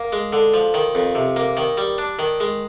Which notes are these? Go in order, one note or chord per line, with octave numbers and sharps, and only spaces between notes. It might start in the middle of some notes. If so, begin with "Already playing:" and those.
Already playing: A#3
G#3
D3
F3
D#3
F2
C3
A#3
D#3
G3
D4
D#3
G#3